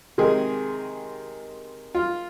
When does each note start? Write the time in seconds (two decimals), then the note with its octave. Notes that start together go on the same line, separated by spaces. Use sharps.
0.18 C3 D#3 G#3 G#4
1.95 F4